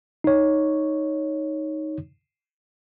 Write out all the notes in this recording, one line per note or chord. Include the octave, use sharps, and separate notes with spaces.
D#4 C#5